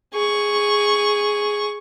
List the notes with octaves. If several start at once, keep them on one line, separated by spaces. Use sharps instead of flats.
G#4 C#6